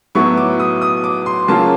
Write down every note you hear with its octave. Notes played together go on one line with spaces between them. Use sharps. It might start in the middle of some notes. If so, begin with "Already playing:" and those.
A2 F#3 B3 E4 C#6
D6
D#6
D#6
D6
C6
C#3 F#3 A#3 C#4 F4 A5